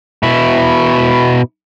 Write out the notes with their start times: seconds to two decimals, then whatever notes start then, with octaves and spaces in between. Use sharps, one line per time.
0.23 B2 E4